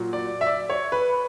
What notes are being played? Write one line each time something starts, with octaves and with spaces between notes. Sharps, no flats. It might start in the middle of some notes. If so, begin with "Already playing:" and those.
Already playing: A#2 F#3
D5
E5
D5
C#5
B4